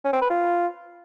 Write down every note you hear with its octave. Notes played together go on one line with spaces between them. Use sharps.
C#4
C4
B4
F4